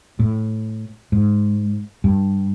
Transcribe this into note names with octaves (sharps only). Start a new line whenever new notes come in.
A2
G#2
G2